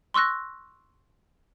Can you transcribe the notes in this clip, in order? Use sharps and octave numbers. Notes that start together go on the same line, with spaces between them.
C6 C#6 E6 F#6 A#6